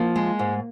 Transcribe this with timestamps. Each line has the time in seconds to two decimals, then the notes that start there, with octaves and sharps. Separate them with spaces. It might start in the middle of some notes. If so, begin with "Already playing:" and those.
Already playing: F3 A#3
0.16 G#3
0.39 G#2